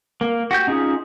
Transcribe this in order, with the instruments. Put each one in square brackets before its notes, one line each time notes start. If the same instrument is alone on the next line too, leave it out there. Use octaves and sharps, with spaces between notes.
[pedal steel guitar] A#3
F#4 G4 G6
C#4 D#4 F4 G#4